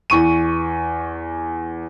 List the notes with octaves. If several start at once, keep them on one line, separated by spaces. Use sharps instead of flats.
E2 C#6 D#7